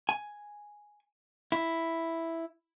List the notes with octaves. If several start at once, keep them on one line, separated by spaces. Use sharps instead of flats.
G#5
E4